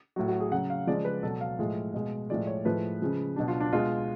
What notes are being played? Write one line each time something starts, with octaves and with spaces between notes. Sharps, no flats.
A2 F#3 F#4
F#4
G#4
C#3 F#3 F#5
F5
C#3 F3 G#3 D5
B4
B2 F#3 A4
F5
A2 F3 G#3
B2 G#3
A2 F3 G#3 D5
C#5
A2 F3 G#3 B4
C#3 F3 G#3
B2 F#3 D4
F4
D4
B2 G#3 F4